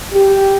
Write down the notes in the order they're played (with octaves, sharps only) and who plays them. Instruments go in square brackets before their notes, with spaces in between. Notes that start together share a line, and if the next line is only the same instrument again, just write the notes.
[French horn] G4